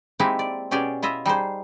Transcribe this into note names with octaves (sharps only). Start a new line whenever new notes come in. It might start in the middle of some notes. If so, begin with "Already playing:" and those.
G#3 A#3 C4 D#4 E4 G4
D5
B2 C#4 G4 G#4 D5
E4 F4 D#5 E5
G3 D#4 G#4 C5